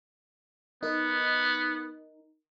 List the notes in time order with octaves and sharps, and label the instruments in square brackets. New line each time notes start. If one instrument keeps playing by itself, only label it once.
[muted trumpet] B3 [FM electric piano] D#4 A#4